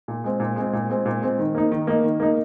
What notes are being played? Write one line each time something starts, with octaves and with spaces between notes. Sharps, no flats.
A#2
G#3 C4
A#2
G#3 C4
A#2
G#3 C4
A#2
G#3 C4
D#3
A#3 D#4
D#3
A#3 D#4
D#3
A#3 D#4